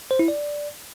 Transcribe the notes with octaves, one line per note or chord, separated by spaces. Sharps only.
C5
E4
D5